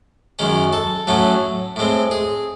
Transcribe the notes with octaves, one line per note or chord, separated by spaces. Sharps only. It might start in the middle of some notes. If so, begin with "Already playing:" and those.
F#2 D#3 G#3 C#4
A4
A2 F#3 A3 C#4
A2 G#3 C4
G#4